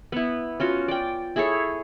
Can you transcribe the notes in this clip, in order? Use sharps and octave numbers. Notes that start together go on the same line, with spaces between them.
B3 E4
C#4 F4 F#4
D5 G5
E4 G#4 A4 C#5